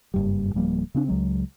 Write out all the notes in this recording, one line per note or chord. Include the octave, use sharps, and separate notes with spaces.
F#1 G2 G3
D1 F3 G3 A#3
C#3 C4 D4
C#2 F#3 G#3